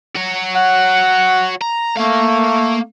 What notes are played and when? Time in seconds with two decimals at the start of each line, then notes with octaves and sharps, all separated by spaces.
0.16 F#4 C#5
0.55 F#5
1.62 A#5
1.97 A3 A#3 F5